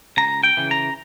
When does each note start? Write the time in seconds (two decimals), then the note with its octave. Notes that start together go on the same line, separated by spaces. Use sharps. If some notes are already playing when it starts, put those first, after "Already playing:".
0.17 C#2 A#5
0.43 G5
0.57 C#3 E3
0.71 A#5